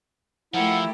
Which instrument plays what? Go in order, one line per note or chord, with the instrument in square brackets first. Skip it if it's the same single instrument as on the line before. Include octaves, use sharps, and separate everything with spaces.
[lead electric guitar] F3 [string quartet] A3 G4 A#4 [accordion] E4 E6 [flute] F#5